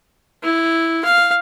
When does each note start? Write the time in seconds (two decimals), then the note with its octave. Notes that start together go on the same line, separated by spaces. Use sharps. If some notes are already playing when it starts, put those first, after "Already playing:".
0.43 E4
1.05 F5